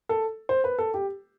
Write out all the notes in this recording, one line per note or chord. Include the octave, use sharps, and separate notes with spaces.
A4
C5
B4
A4
G4